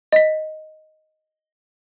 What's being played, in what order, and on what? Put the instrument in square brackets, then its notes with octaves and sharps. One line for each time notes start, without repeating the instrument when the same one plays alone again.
[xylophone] D#5 B6